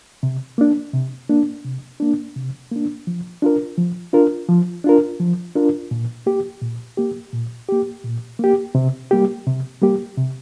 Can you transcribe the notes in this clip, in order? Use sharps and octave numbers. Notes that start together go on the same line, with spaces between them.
C3
A#3 D4
C3
A#3 D4
C3
A#3 D4
C3
A#3 D4
F3
D4 F4 A#4
F3
D4 F4 A#4
F3
D4 F4 A#4
F3
D4 F4 A#4
A#2
A#3 G4
A#2
A#3 G4
A#2
A#3 G4
A#2
A#3 G4
C3
G3 A#3 G4
C3
G3 A#3 G4
C3